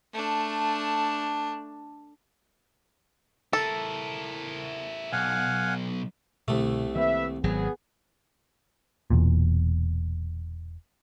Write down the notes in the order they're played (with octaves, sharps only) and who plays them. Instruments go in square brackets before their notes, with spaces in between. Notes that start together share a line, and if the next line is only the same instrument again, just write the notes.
[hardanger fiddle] A3 D4
[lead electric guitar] E4 A#4 [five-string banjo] A4
[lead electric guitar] B1 [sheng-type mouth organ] F5 F#5 G#5
[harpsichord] C2 A3 [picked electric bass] B2 D3
[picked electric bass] D#3 A#3 C4 [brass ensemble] B4 E5
[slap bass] G#1 F#3 [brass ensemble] B3 G#4
[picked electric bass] E1 E2 A#2